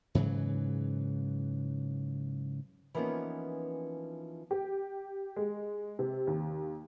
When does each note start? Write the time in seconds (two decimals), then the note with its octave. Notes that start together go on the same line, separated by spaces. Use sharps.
0.15 G#2 C#3 E3 F#3
2.95 E3 F3 A#3 B3 C#4 D#4
4.51 G4
5.36 G#3
5.99 C3
6.27 D#2